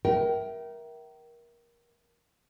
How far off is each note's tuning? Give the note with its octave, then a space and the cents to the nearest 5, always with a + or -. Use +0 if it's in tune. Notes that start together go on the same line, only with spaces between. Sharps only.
A#4 +20 E5 +0 G5 -30